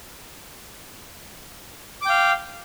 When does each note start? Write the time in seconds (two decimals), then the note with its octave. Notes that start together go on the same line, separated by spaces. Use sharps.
2.02 D6
2.06 G5
2.09 F5